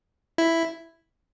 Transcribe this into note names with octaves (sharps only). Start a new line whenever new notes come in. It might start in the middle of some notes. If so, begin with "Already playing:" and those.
E4